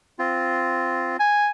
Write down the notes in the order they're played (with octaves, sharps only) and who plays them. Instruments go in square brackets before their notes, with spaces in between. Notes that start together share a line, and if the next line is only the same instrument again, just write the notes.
[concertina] C4 F4
[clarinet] G#5